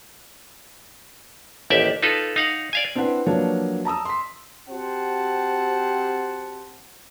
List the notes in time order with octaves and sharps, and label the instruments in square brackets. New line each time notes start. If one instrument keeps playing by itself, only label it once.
[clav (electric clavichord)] A1 D#2 G4 D5 E5
D#4 F4 A4 B4
D#4 F5 F#5
D5 F5 G#5
[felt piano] C4 D4 E4 B4 F#5
F3 F#3 A#3 D4 B4 C#5
A5 A#5 D#6 E6
C6 B6
[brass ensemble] C4 F#4 G4 C5 F#5 A5